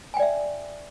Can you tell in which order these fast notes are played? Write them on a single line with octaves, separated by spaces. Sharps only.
G#5 G5 D5 E5